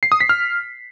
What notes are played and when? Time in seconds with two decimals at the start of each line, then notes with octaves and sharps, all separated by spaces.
0.03 C7
0.12 D#6
0.21 B6
0.29 F6